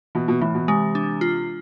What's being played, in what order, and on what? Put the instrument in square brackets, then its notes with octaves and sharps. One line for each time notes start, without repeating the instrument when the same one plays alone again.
[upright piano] B2 [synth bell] E3
[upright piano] B2
[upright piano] A2 [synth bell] E3
[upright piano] B2
[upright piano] C3 [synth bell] G#3
[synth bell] D4
F4